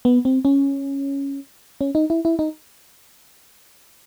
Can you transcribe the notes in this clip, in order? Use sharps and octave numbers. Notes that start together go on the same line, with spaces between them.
B3
C4
C#4
C#4
D#4
E4
E4
D#4